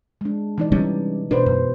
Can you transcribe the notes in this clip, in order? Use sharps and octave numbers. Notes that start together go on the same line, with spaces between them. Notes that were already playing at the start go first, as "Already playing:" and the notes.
G#3 D4
E3 D#4 D5
C3 G3 C#4
B2 D4 B4 C5
F#2